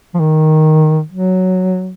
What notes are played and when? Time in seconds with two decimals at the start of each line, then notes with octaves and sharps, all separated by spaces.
0.14 F3
0.20 D#3
1.12 F#3